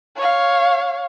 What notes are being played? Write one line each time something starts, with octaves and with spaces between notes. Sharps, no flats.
C#5 F5